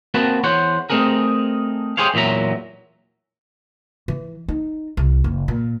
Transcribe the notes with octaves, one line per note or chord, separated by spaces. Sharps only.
A#3 C4 F#4 B4 A5
E2 C5 C#5 F#5
A3 C4 D#4 G#4 A#4
G4 G#4 C5 C#5 F5
E2 A#2 F#3 E5 A#5
E3
D#4
C2
F#1
A#2